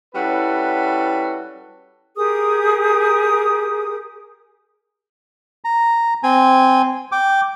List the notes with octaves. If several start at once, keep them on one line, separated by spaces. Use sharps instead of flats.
G3 C#4 E4 F#4 A4 B4
G4 G#4 A#4 D#6
A#5
C4 G#5
G5 D6